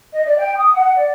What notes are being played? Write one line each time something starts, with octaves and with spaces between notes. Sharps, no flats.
D#5
D5
G5
D#6
F#5
D5